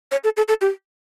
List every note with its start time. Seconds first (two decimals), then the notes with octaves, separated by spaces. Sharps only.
0.11 C#5
0.24 A4
0.37 A4
0.48 A4
0.61 G4